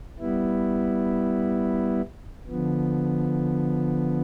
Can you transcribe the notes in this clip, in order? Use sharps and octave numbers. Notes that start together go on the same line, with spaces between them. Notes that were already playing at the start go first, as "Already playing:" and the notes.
G3 B3 E4
D3 F3 B3